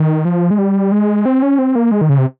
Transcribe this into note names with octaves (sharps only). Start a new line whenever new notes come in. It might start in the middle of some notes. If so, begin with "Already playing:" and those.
Already playing: D#3
F3
G#3
G3
G#3
C4
C#4
C4
A#3
G#3
D#3
C#3
C3